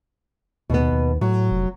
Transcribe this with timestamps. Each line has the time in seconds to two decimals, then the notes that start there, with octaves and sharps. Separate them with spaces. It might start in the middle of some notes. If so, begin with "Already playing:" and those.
0.70 D#2 B2 B3
0.92 D#2
1.21 A2 F#3
1.51 F1